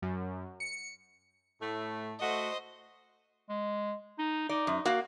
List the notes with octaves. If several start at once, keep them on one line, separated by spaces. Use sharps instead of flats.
F#2
C#7
A2 A3
A3 F#4 C5 D#5
G#3
D#4
D#4 D5
F#2
A#3 F#4 F5